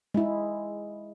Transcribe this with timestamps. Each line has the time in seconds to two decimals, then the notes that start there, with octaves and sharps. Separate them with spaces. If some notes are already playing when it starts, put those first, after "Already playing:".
0.14 G#3 E4